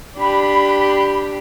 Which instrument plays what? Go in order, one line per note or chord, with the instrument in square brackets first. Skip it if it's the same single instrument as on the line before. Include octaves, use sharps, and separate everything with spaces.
[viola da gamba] D4 G4 [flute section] B5